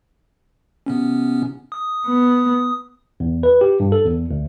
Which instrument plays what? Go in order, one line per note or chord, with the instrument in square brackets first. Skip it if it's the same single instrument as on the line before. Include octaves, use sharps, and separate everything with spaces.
[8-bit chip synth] C3 B3 C#4
D#6
[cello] B3
[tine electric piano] E2
B4
G4
G2
A4
E2
D2